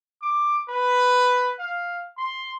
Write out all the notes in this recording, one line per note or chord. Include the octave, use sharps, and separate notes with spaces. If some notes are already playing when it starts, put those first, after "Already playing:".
D6
B4
F5
C6